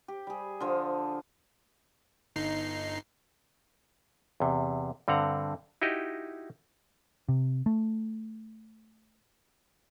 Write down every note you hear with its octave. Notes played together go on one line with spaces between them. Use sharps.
G4
G3 G#4
D3 F3
G1 D#4 C7
E2 C3
G2 D3 C4 F#5 A#5
D#4 E4 F#4 G4 D#5
C3
A3